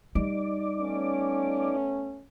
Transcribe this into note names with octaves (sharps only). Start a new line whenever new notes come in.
G3 D#4 D5 D6
A3 B3 C#4